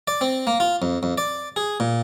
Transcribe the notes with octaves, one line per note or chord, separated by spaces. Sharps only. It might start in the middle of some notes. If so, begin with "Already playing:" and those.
D5
C4
A#3
F4
F2
F2
D5
G#4
A#2